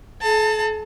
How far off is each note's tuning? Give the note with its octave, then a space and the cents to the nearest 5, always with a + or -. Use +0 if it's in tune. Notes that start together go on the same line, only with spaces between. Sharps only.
A4 -40 A5 +30